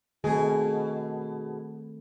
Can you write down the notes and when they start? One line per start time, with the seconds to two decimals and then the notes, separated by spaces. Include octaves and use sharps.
0.24 B2 D#3 A3 C4 G#4